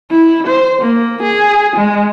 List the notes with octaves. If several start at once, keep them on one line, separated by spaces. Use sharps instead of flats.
E4
C5
A#3
G#4
G#3